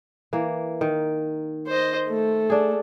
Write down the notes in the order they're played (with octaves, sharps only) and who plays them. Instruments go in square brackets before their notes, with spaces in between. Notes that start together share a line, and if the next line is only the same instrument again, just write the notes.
[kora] E3 A#3
D#3
[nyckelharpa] C5 D#5
A3
[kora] D4 G#4